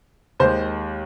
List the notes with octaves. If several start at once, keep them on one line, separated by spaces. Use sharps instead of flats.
D#2 D#3 G#3 C5